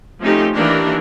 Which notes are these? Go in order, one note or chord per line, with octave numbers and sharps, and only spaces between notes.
F3 A3 C4 C#4 D#4 G4
D#3 E3 A#3 D4 G4 A#4